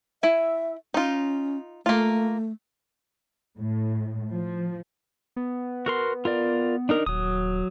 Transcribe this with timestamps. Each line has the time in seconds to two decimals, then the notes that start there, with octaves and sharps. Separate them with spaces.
0.23 E4 E5 G#5
0.94 C#4 D#4 F4
1.86 A3 A#3 F4
3.59 A2
4.34 F3
5.36 B3
5.86 F#4 A#4 C6
6.25 F4 A#4 D5
6.89 D4 D#4 A#4
7.06 D#1 F#3 D#6